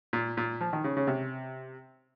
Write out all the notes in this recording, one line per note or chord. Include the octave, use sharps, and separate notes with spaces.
A#2
A#2
F3
D#3
C#3
C#3
C3